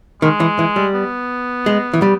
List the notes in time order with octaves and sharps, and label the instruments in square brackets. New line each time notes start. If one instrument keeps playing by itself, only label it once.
[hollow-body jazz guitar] D#3 [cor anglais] G#3
[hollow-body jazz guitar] E3
E3
G3
[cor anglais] B3
[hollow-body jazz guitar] G#3
E3
G3